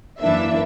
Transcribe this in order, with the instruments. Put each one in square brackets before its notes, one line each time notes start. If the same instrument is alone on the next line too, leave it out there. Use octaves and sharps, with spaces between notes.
[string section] F#2 E3 A#3 D4 E5